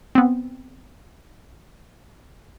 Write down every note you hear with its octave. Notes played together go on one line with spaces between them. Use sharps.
B3 C4